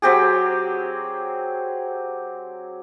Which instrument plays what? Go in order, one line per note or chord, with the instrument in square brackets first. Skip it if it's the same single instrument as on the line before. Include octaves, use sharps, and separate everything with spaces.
[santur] F#3 C4 G4 G#4